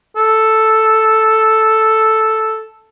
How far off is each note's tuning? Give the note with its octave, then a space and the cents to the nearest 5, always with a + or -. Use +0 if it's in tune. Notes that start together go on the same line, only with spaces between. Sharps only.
A4 +0